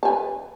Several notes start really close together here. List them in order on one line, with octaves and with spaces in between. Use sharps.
A5 G#5 B4